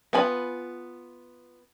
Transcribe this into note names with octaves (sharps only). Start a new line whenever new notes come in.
B3 F4 G#5 B5